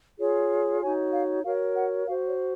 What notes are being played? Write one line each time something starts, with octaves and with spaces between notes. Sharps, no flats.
F4 G#4 C#5
D#4 F#4 C#5 G#5
F5
F#4 A#4 C#5 F5
F#5
F#4 C5 F5
C#5